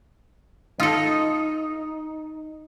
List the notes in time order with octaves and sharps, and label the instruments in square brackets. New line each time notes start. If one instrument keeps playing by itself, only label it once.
[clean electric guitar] D#4 [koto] F4 A4